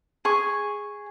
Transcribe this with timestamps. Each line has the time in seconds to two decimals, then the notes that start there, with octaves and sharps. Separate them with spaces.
0.25 G#4 C#6